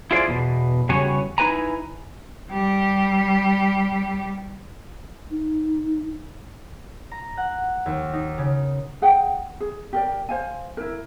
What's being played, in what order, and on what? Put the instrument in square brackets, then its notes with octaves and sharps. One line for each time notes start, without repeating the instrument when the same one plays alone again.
[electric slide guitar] E4 F4 G#4 C5 D5
E2 B2
E2 C#3 G3 F#4 C#5 G#5
D#4 E4 B4 G#5 A#5
[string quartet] G3 G4
[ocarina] D#4
[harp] A#5
F#5
D#2
D#4
C#3
[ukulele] G#4 F#5 G5
G#4
G4 A#4 D5
C5 F5 G#5
E4 A#4